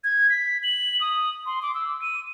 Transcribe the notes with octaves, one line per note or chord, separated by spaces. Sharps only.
G#6
B6
F#7
D#6
C6
D6
E6
D#7